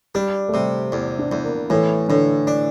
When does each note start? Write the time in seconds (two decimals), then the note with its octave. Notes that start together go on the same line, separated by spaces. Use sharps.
0.15 G3 D4
0.49 A3
0.54 C3 G3
0.92 E2
1.19 D4
1.32 E2
1.44 A#3
1.70 A2 E3
2.09 A2 D3
2.47 D4